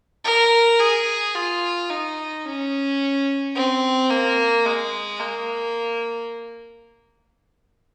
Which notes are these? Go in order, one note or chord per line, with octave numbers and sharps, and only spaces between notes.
A#4
G#4
F4
D#4
C#4
C4
A#3
G#3
A#3